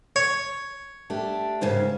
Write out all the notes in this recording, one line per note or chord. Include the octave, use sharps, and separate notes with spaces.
C#5
A3 D4 G4
D#2 G#2 C#3